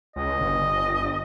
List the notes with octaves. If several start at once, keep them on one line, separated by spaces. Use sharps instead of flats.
C#2 D#5
G1